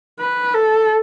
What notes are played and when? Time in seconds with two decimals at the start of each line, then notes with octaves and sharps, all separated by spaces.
0.19 B4
0.54 A4